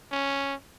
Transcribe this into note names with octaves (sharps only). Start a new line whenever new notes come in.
C#4